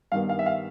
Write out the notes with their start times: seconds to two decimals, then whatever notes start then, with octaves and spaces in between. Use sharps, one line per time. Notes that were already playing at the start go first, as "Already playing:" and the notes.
0.12 G2 D#3 G3 B3 F5
0.29 F5
0.39 E5
0.46 F5